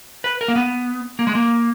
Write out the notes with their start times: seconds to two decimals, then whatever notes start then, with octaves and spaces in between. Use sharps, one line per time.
0.24 B4
0.41 A#4
0.48 A#3
0.56 B3
1.19 A#3
1.27 G#3
1.35 A#3